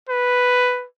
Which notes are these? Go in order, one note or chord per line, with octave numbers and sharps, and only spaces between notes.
B4